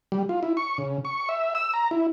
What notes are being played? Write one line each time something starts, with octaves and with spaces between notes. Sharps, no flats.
G3
F4
E4
C#6
C#3
C#6
E5
E6
A#5
E4